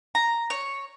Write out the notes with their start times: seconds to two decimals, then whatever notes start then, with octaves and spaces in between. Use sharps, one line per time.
0.15 A#5
0.50 C#5